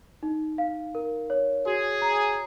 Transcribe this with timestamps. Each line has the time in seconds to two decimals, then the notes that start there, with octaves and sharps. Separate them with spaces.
0.23 D#4
0.58 F5
0.95 A#4
1.30 C#5
1.66 F#4 G#4
2.02 A#5